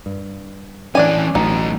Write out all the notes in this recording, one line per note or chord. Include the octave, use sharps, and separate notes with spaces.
G2
E3 C#4 D4 D5 G#5
A1 F#3 B3 D#4